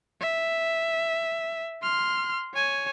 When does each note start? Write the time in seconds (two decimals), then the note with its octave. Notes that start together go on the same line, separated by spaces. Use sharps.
0.21 E5
1.82 C6 F6
2.54 C#5 G#5